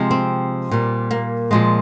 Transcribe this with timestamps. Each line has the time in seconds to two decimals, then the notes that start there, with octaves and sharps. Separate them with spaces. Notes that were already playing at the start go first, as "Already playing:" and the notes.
Already playing: C3 F3 G#3
0.11 C4
0.71 A#2 G3
1.11 A#3
1.51 A#2 F3 G#3